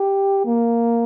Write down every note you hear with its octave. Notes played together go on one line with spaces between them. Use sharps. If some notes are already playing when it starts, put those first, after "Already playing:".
Already playing: G4
A#3